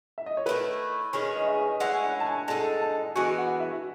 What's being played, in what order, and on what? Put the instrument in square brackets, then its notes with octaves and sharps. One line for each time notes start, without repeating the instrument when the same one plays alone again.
[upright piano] E5
D#5
C#5
[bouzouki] D#3 A3 E4 [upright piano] B4
[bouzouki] D#3 G#3 C#4 G#4 [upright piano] C#5
[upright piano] D#5
E5
[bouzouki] G#3 C#4 E4 [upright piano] F#5
[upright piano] F#5
A5
G#5
[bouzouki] G#3 D#4 A4 [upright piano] A5
[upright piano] A5
[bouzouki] E3 G#3 B3 F#4 [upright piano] G#5
[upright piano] F#5
E5